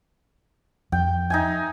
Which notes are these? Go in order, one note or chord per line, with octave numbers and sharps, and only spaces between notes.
F2 G5
D#4 E5 G#5